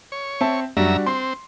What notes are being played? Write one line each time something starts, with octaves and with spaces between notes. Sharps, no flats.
C#5
C4 E5 A5
F#2 G3 D4 F#4 E5 A#5
C4 C6